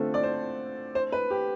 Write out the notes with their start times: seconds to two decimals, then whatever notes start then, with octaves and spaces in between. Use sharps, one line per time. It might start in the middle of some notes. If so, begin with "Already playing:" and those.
Already playing: D3 A3 C4 F4 A4
0.14 D5
0.23 C5
0.95 C5
1.12 B4
1.30 G4